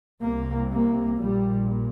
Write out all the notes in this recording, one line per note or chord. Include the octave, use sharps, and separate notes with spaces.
C2 C3 A#3
A#3
A#1 A#2 G3